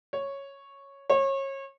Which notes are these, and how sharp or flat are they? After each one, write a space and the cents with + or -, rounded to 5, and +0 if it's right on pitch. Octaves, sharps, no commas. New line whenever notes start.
C#5 -5
C#5 -30